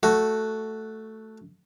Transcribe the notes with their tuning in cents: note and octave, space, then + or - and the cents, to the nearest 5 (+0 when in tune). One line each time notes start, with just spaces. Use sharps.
A3 +0 F#4 +0